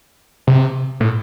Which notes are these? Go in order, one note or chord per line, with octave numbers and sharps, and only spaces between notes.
C3
A2